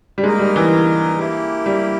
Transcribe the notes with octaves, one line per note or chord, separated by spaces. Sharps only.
G3
G#3 A#3 D#4 A#4
G3
E3
A#3 E4 G4
G3